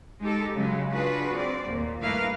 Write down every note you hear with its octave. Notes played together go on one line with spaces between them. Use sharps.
G#3 D#4 G4 A4
C#3 F#3 G#3
D4 F4 F#4 G#4 B4
C4 D5
D#2 A#2
G2 A3 A#3 E4 B4 F5